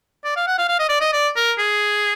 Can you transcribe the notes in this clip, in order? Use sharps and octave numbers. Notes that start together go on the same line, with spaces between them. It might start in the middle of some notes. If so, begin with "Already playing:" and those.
D5
F5
F#5
F5
F5
D#5
D5
D#5
D5
A#4
G#4